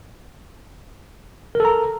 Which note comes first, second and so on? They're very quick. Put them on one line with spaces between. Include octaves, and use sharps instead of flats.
A#4 A4 A#5